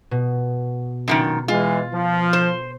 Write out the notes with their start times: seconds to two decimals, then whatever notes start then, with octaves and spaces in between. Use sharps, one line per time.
0.11 B2
1.08 F#2 A#2 D#3
1.48 E3 G#3 F4
1.92 F3
2.33 C5